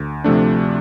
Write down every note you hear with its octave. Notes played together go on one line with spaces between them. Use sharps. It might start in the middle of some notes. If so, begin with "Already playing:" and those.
Already playing: D2
C3 F3 A3 D4